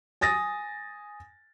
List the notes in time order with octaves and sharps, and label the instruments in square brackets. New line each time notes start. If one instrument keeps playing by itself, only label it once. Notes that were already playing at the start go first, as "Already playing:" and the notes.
[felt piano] G#5 D#6 A6 A#6